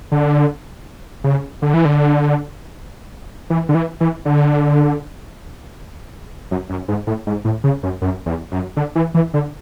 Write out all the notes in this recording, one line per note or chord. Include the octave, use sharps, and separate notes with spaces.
D3
C#3
D3
E3
D3
E3
D3
E3
E3
D3
F#2
F#2
G#2
A2
G#2
A2
C#3
F#2
F#2
E2
F#2
D3
E3
E3
D3